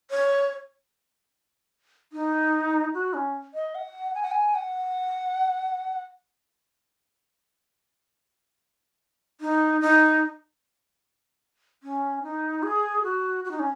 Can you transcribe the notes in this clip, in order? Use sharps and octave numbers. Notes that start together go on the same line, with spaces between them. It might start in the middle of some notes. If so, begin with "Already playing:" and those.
C#5
D#4
F#4
C#4
D#5
F#5
G#5
F#5
G#5
F#5
D#4
D#4
C#4
D#4
G#4
F#4
F#4
D#4
C#4